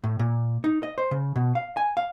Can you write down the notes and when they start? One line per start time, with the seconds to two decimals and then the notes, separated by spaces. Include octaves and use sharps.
0.04 A2
0.19 A#2
0.64 D#4
0.83 D#5
0.98 C5
1.11 C#3
1.36 B2
1.55 F5
1.77 G#5
1.97 F5